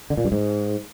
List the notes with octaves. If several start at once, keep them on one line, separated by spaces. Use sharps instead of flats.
D3
A#2
G2
G#2